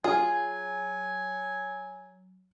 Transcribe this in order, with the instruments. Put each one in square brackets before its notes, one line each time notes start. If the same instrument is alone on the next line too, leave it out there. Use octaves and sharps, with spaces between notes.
[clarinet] F#3 [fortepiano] F4 [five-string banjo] G#4 [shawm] G#5